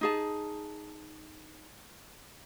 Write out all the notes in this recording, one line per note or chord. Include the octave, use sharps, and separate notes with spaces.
D#4 G#4 A5